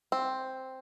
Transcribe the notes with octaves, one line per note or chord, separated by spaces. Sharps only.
C4